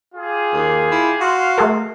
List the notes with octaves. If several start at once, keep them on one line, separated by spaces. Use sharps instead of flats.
F4 G4 G#4
D#2
E4
F#4 F5 C6
A3 G#4 A#4